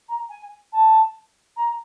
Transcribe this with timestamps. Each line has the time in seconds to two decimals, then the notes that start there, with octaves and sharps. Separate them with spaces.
0.09 A#5
0.29 G#5
0.72 A5
1.56 A#5